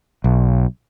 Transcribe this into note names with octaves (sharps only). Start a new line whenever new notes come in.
B1